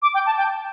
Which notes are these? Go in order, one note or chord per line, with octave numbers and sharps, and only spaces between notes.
D6
G5
A5
G5